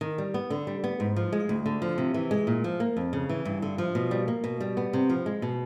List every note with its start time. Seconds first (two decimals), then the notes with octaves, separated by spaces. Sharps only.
0.01 D#3
0.18 G3
0.34 B3
0.50 D3
0.67 G3
0.84 B3
1.00 G#2
1.16 F3
1.32 G#3
1.49 D2
1.66 D3
1.82 F3
1.98 C3
2.14 E3
2.31 G#3
2.47 A#2
2.64 F3
2.80 A#3
2.97 F2
3.13 C#3
3.29 E3
3.45 G2
3.62 D3
3.78 F3
3.95 B2
4.11 G3
4.28 A#3
4.44 B2
4.60 G3
4.77 B3
4.93 C3
5.09 F3
5.26 G#3
5.42 B2